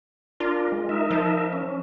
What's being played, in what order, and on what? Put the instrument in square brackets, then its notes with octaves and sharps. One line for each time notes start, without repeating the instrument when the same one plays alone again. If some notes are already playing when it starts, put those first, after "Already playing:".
[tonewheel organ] D4 A#4 [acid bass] F4
[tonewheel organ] G#3
D#4 A#4 E5
[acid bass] F3
[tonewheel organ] C#4